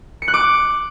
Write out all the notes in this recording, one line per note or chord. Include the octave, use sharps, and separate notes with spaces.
C#7
F#6
D6